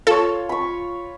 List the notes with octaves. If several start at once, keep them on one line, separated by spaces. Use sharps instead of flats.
F4 A4 C#5
B5 C#6